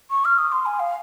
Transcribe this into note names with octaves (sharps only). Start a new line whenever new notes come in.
C#6
F6
D#6
C6
G#5
F5